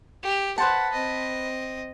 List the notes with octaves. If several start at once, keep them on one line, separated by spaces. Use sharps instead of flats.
G4
B4 C5 F#5 A5
C4 D#5